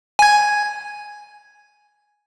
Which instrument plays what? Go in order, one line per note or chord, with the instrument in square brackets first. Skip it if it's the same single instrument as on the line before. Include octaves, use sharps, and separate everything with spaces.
[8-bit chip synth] G#5 G#6